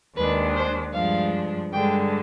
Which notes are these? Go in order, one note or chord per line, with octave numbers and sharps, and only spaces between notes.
D#2 D#3 G#3 D4 B4
C5
G2 F3 G#3 D4 F5
G2 D3 G#3 G5